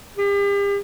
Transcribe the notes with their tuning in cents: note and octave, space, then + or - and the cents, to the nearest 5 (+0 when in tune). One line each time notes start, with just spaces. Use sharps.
G4 +40